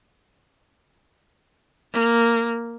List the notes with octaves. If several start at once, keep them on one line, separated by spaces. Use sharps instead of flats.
A#3